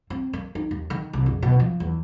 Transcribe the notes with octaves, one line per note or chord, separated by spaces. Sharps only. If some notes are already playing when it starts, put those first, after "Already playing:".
C4
A#3
D#4
D#2
D#3
C2
F#1
B2
F3
E2